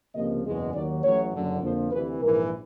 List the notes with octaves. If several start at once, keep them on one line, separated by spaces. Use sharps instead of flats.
C#2 C3 F3 A#3 D#5
F#1 E2 B2 G#3
D#2 D#3 F#3 D5
A1 A2 F#3 C#5
F#1 F#2 D3
F2 D3 F3 A#3 C5
D2 C3 E3 B4
A#1 G#2 E3 A#4